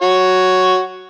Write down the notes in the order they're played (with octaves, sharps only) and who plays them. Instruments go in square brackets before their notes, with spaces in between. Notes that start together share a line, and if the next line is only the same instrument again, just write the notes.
[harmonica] F#4 C#5